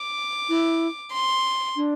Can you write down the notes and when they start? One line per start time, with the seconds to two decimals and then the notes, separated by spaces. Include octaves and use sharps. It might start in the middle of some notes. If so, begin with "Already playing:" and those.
Already playing: D6
0.49 E4
1.13 C6
1.76 D4